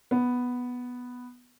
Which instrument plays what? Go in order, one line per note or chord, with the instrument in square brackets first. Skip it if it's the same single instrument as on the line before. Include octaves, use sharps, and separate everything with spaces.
[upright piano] B3